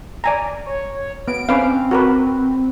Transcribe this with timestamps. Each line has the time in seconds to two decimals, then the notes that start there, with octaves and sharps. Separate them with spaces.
0.24 D5 G#5 A#5
0.66 C#5
1.28 B3 D7
1.49 C4 C#4 B4 F5
1.91 F#4 A#4 B4